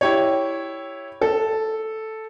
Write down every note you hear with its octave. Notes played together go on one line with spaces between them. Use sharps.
E4 G4 C#5
A4